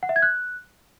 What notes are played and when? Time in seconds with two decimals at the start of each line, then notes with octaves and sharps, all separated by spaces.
0.03 F#5
0.09 E5
0.16 G#6
0.22 F#6